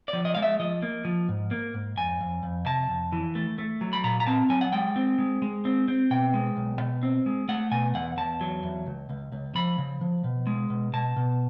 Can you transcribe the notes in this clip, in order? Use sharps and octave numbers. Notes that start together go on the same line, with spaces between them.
D5
F3
D#5
G#3 F5
E5
F3 D#5
A#3
F3
G#2
A#3
G#2
F2 G#5
F2
F2
C3 A5
F2
E3
A3
A3
F#3
B5
A#2 A#5
A#5
C4 A5
F#3 G#5
F#5
G#3 G5
C4
G#3
G#3
C4
C4
B2 G5
G#3
B1
B2
C4
G#3
A3 F#5
B2 G#5
E2 F#5
E2 A5
F#3
E2
C#2
C#2
C#2
F3 B5
C#3
F3
B2
G#3
B2
B2 A5
B2